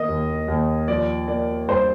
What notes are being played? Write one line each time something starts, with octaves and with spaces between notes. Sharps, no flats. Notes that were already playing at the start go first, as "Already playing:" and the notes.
Already playing: D#3 A#3 D#5
D#2
D#2
F3 D5
A#3 D5
G2 C5